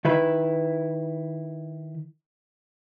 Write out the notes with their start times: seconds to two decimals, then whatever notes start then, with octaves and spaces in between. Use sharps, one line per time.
0.05 D#3 E4 B4